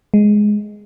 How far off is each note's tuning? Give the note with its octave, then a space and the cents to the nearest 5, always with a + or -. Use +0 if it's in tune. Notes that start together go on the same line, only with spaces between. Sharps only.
G#3 +5